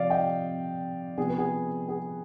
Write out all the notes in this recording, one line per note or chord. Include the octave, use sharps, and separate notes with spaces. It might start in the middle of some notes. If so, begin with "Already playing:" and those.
Already playing: C3 F3 C4 D5 F5
D#5 G5
C3 F3 B3 G#4
B4
G#4
G#4